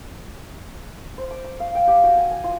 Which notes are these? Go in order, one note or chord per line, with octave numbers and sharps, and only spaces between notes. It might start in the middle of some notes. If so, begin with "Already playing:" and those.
C5
D6
C#6
F5
G5
G4
F#4
G#5
G#5
F4